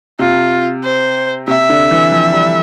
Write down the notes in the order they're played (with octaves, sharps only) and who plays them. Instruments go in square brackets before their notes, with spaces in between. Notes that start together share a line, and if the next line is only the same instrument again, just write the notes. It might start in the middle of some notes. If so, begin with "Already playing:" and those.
[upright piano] C3 [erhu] F4
[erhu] C5
[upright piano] C3 [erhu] E5
[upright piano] D3
E3
F3
G3